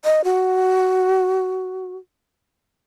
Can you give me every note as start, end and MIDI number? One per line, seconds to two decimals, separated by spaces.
0.05 0.21 75
0.24 1.96 66